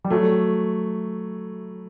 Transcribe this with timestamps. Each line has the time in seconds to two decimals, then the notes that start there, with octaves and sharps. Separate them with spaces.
0.04 G3
0.10 F#3 A3